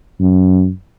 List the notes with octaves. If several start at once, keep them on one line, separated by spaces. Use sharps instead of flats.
F#2